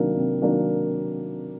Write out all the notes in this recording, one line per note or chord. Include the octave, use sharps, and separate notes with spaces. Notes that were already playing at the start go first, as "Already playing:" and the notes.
Already playing: C3 D#3 F#3 A#3 D4
C3
D#3 F#3 A#3 D4